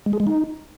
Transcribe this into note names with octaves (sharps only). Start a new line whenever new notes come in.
G#3
G#4
G#3
D#4